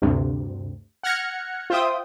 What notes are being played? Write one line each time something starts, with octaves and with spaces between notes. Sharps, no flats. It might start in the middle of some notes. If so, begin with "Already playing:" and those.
D2 G2 C3
F#5 F6 F#6 G#6 A#6 C#7
F4 C5 E5 G5 D#6